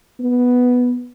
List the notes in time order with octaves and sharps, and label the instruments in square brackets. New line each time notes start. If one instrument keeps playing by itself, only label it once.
[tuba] B3